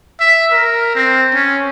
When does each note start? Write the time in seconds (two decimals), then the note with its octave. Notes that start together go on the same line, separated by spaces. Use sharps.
0.20 E5
0.52 A#4
0.95 C4
1.34 C#4